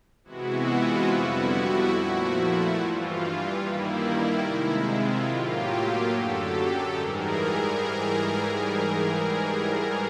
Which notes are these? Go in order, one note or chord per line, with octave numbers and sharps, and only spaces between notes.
C3 E3 G#3 B3 E4 F#4
F4
F2 D3 G3 B3 E4 F#4
E4 F#4
A#2 F3 A3 E4 F#4
G2 E3 G3 F4
G2 D#3 G3 A#3 E4
C3 D#3 G#3
F4
A2 F#3 A#3 F4 G4
F#2 D3 F#3 G4 A4
G#2 E3 G3 G#4 A#4